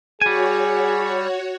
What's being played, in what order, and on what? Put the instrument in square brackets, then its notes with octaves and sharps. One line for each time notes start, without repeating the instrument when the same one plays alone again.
[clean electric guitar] G3 G#5 [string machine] F#4 C#5 [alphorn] G#4